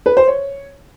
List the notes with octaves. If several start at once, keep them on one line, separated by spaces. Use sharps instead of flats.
B4
C5
C#5